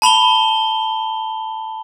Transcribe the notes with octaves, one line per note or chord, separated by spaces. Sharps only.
A5 B5 F7 G7